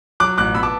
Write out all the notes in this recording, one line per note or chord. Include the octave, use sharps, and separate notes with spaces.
F#3 D6 F#6
A1 D6 F#6
B3 B5 E6
A5 D6